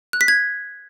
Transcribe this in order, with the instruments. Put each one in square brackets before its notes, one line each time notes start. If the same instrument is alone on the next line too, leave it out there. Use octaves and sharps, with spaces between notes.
[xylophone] F#6
B6
G#6